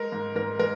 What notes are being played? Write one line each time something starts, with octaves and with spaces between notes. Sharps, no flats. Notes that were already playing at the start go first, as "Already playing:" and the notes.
Already playing: G#3 A#4
G#2
G#2 A#4
G#3 A#4